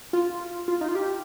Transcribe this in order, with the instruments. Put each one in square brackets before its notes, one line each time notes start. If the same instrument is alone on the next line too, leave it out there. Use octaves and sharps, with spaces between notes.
[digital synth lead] F4
F4
D#4
F4
G4